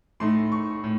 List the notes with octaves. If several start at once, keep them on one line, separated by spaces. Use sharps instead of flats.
A2 A3 D#4 C6
C#6
A2